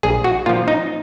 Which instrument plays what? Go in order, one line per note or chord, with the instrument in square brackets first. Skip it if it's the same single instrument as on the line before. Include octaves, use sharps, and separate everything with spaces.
[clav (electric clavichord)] A#1 G#4
F#4
A#2 F3 F4
D#4